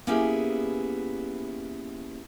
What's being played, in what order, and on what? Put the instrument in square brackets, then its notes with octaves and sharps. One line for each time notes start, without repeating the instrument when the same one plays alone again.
[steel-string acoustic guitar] A#3 B3 C#4 E4 G4 G#4